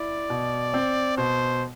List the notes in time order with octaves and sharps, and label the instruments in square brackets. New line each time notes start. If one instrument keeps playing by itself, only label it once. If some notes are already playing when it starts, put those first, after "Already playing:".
Already playing: [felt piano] E4 [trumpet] D5
[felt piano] B2
C4
[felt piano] B2 [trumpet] C5